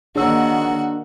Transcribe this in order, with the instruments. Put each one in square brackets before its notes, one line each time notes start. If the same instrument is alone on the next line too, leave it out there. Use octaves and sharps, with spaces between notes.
[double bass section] D#3 A#3 [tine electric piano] D4 [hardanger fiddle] F#4 F#5 [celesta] G#4 C#5 E6